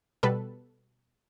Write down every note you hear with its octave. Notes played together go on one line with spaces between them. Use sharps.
B2 G3 A4 B4